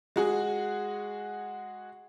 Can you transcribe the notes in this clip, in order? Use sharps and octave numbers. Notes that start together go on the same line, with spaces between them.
G#3 F#4 G#4